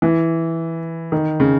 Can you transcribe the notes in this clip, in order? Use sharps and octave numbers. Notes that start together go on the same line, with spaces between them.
E3
D#3
C#3